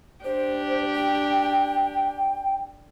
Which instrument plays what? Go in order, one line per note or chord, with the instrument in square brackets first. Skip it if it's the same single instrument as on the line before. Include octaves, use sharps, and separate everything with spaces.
[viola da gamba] D4 G4 [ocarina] C5
[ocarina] G5